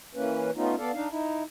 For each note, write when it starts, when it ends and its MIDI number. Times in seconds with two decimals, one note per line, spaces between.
0.15 0.51 52
0.15 0.51 58
0.15 0.51 61
0.15 0.51 71
0.56 0.75 57
0.56 0.75 59
0.56 0.75 61
0.56 0.75 63
0.56 0.75 65
0.78 0.91 59
0.78 0.91 69
0.78 0.91 74
0.78 0.91 77
0.94 1.08 62
0.94 1.08 63
0.94 1.08 77
1.10 1.44 63
1.10 1.44 64